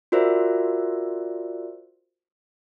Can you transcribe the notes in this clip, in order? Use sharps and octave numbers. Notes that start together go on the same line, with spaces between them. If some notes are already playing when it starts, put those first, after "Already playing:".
F4 F#4 A#4 C5 D5 E5